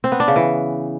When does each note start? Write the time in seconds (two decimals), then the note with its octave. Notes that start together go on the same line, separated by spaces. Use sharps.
0.04 C4
0.12 B3
0.20 D4
0.28 C#3
0.36 E3